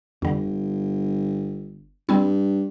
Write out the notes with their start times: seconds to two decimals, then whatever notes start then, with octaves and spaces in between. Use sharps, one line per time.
0.22 G1 F2 D3
2.09 G2 G3 C4 E4